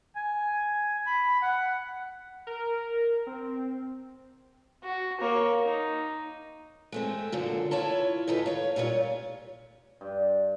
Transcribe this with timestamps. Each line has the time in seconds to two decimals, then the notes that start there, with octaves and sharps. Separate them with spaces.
0.15 G#5
1.07 B5
1.42 F#5
2.47 A#4
3.27 C4
4.84 F#4
5.21 A#3 C#5
5.66 D#4
6.92 G#3 A3 C4
7.32 F#2 A#2 D3
7.71 E4 F4 C#5 A5
8.28 G#2 D3 D#4 A4 B4
8.46 C#5 F5
8.76 A#2 G3 F4 C#5
10.01 G2